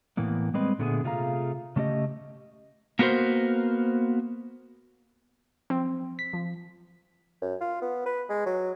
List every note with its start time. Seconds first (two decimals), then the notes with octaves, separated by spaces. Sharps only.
0.17 A2 E3 A#3 B3
0.54 G3 G#3 C4 B4 D#5
0.79 A#2 D3 A3 B3 G4 G#4
1.04 C3 A3 F4 G#4 F5 A#5
1.76 C#3 A3 C#4 G4 D#5
2.99 A#3 B3 F#4 A#4 C5
5.70 F3 C4
6.19 B6
6.33 F3
7.42 F#2
7.61 F4
7.82 B3
8.06 B4
8.29 G#3
8.46 F#3